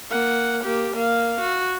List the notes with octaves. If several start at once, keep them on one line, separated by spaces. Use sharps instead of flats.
A#3 F#5
A#3 G4
A#3 F5
F#4